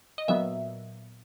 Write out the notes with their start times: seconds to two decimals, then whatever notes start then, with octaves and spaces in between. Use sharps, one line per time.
0.18 D#5
0.28 A#2 F#3 B3 E5